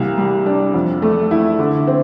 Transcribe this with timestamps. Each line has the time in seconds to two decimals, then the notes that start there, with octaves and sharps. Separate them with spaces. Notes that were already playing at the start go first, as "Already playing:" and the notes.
Already playing: C2 A#3
0.18 G3
0.46 D4
0.74 F2
1.02 A3
1.31 E4
1.59 D3
1.87 C4